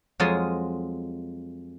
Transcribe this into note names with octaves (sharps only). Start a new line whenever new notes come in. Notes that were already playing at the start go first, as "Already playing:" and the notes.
F2 F#3 G#3 F4 D#5 G#5